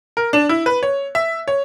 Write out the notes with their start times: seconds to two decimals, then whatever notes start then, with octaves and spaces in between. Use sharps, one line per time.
0.17 A#4
0.33 D4
0.49 E4
0.66 B4
0.83 C#5
1.15 E5
1.48 C#5